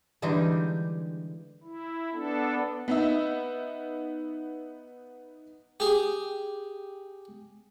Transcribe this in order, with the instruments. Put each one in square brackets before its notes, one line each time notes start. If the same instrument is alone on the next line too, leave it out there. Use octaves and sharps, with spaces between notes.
[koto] D3 E3 G3 G#3 D#4 G4
[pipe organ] E4
B3 D4 A4
[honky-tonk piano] B3 D#4 E5
[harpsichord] G4 G#4